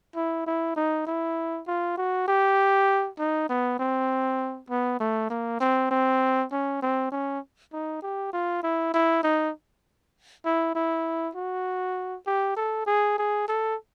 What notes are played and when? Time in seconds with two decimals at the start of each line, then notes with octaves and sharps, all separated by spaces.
0.16 E4
0.46 E4
0.76 D#4
1.07 E4
1.67 F4
1.97 F#4
2.28 G4
3.19 D#4
3.49 B3
3.79 C4
4.70 B3
5.00 A3
5.30 A#3
5.60 C4
5.91 C4
6.52 C#4
6.82 C4
7.12 C#4
7.73 D#4
8.02 G4
8.33 F4
8.63 E4
8.94 E4
9.23 D#4
10.45 E4
10.75 E4
11.35 F#4
12.26 G4
12.57 A4
12.87 G#4
13.18 G#4
13.48 A4